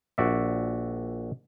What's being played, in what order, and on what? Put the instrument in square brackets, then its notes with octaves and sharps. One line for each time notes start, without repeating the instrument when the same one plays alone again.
[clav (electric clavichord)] A#1 F#4 D5 E5